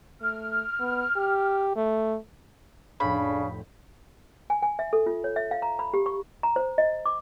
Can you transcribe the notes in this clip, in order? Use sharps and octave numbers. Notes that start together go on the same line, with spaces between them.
A3 F6
B3
G4
A3
F1 A2 C#3 D4 B5 G6
G#5
G#5
E5
A4
F4
C#5
E5
F5
A#5
B5
G4
C#6
A#5
C5
D#5
D6